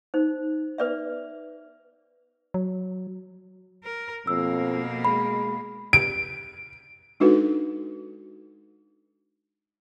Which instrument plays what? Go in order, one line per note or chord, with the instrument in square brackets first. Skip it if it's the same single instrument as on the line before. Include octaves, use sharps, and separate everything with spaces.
[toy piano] D#4 C5
B4 D5 E5
[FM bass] F#3
[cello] A#4
[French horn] F2 [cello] B2 A#3 [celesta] E6
[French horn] G#3 [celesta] B5
[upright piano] D7
[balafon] G#3 D4 D#4 F#4 A4 B4